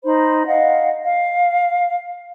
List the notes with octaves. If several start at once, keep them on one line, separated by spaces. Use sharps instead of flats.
D#4 C5 B5
D#5 F5 F#5
F5